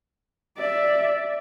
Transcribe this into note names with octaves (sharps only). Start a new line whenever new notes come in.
D5 E5